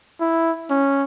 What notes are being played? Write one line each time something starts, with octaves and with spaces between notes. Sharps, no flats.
E4
C#4